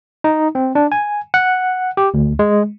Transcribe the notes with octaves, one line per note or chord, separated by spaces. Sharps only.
D#4
C4
D4
G#5
F#5
G4
D2
G#3